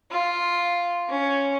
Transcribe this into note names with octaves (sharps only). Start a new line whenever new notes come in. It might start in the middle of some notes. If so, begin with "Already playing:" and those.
F4
C#4